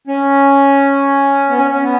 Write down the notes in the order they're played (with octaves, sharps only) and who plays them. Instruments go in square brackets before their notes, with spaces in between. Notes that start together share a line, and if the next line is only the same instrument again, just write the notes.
[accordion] C#4
B3
C#4
C#4
B3